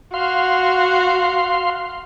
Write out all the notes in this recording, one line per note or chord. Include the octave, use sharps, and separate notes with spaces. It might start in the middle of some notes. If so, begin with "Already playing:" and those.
F#4 F5 C6